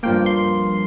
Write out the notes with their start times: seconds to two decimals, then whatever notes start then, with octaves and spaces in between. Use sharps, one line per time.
0.03 G2 F3 A#3 G5
0.26 C6